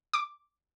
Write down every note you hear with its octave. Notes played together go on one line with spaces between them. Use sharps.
D6